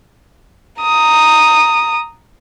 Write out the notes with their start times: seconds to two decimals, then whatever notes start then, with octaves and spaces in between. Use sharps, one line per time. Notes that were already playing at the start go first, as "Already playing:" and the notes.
0.82 A#5 D#6